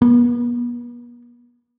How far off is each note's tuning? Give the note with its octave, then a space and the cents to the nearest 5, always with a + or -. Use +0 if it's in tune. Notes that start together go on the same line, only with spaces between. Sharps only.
B3 -40